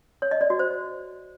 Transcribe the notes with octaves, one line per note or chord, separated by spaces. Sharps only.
C#5
D#5
D5
F#4
C5